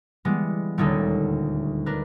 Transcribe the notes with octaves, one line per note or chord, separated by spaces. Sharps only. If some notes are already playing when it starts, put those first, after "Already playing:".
E3 G3 G#3 B3
D#1 D2 G3 C#4 D#4 A4
D4 A#4 B4